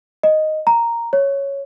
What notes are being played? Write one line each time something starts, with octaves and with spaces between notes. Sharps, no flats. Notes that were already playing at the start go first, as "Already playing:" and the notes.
D#5
A#5
C#5